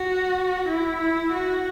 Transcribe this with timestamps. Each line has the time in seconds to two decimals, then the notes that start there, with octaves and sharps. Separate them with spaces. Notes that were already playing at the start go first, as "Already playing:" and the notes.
Already playing: F#4
0.68 E4
1.01 E4
1.32 F#4